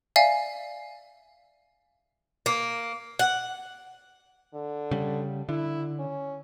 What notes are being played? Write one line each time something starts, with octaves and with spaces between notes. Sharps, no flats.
D5 E5 F5 G#5
A#3
F#5
D3
C#3 G3
D3 E4
C#4